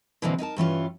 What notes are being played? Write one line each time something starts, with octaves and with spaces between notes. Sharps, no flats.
B2 D3 E3 G3 A#3 C4
D#4 E4 A#4 A5
G2 E3 C#4 F4